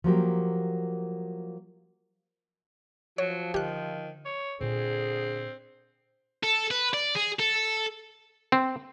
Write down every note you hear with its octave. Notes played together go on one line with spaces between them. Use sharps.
F3 F#3 A#3 G4
F3 F#3 C#5
D3 D#3 G4 F#6
C#5
A#2 D3 B3 C4 G#4
A4
B4
D5
G#4
A4
C4